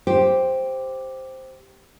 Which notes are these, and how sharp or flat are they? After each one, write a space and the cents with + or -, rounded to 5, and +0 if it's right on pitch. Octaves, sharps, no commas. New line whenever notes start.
G4 +0 C5 +0